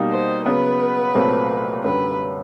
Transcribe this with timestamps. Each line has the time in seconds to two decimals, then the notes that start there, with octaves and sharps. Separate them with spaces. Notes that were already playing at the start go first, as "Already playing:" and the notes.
Already playing: B2 G3 A#3 D#4
0.11 C5
0.46 C#3 F#3 B3 B4
1.15 C2 A#2 F#3 A3 C4
1.84 F#2 D3 G3 B4